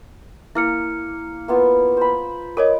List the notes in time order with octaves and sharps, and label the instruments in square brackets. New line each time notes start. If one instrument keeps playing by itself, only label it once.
[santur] A#3 [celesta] E4 F6 C#7
[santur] A#3 B3 F4
C5 B5
[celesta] A#4 C#5 D#5 [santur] D6